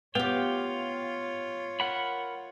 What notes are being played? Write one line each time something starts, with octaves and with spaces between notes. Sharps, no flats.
B3 F4 G4 C#5 F5 G5
A#4 F#5 B5